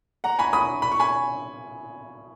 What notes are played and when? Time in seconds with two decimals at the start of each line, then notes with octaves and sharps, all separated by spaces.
0.24 F#5 A#5
0.39 G#5 B5
0.53 B5 D#6
0.82 B5
0.92 C#6
1.00 G#5 B5